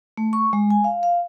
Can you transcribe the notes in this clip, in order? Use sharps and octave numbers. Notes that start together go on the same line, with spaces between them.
A3
C#6
G#3
G#5
F5
F5